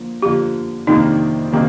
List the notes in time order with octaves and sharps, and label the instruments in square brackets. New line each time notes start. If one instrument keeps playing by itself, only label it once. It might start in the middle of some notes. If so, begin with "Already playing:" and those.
Already playing: [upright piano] D3 F3 A#3
[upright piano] D3 F3 A#3 [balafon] G4
[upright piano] F2 C3 D#3 A#3 D4 [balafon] D#4
[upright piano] C3 D#3 A#3 D4